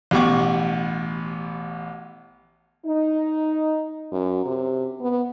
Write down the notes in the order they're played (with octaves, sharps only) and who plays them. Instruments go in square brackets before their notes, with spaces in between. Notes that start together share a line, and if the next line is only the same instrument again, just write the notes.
[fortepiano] A1 B2 G4 F#5 C#6 D6
[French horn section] D#4
[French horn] F#2
C3
B3